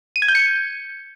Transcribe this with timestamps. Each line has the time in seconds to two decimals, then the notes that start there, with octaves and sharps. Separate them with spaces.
0.16 D#7
0.22 G#6
0.28 G6
0.35 C#7